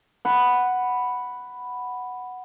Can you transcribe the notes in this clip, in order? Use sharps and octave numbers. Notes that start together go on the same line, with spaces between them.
F#5 B5